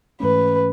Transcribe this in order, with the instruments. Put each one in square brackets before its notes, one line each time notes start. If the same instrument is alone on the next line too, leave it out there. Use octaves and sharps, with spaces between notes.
[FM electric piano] G#2 E3 A3 C#4 [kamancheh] B4